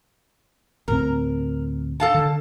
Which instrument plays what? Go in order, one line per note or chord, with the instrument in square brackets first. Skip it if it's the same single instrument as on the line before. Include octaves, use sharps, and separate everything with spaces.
[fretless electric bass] D2 A2 C4 [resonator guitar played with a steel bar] A#4
[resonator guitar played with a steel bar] A4 F5 A5
[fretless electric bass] D3